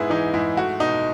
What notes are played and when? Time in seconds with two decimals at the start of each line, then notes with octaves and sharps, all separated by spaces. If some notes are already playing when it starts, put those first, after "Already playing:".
Already playing: G#2 B3 E4 G#4
0.10 E3 D#4
0.34 G#2 E4
0.57 A3 F#4
0.80 B2 D#4